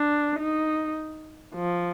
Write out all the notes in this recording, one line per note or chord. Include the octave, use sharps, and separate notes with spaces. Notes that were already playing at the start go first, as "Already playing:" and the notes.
Already playing: D4
D#4
F3